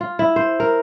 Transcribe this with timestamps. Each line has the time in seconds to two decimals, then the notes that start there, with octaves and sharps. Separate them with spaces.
0.01 F4
0.19 E4
0.36 C5
0.60 A#4